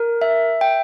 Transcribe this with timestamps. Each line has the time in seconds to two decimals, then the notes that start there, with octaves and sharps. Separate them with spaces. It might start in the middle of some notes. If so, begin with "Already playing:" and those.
Already playing: A#4
0.22 E5
0.61 G5